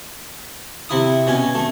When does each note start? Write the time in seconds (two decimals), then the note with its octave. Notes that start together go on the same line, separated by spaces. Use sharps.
0.89 C3 E4 D#6
1.27 B2 C#4 G#5
1.55 A3